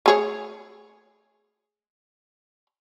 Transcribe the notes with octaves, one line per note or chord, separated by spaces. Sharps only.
A3 G#4 C#5